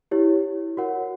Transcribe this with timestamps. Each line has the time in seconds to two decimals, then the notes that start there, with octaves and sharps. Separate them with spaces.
0.11 E4 G4 C#5
0.77 F#4 A#4 C#5 F#5